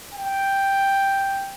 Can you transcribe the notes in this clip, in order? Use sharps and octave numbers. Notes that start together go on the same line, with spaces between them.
G5